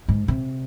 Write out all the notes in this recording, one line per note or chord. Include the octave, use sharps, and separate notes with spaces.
G#2
C3